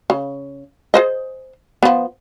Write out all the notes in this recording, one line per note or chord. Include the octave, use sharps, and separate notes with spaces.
C#3
G#4 C5 D#5
F3 B3